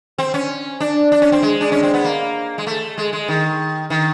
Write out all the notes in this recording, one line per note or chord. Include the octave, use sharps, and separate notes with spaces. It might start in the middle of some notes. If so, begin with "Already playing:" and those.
C4
C#4
D4
D4
C#4
C4
G#3
D4
C#4
C4
B3
A#3
G#3
A3
G#3
G#3
D#3
D#3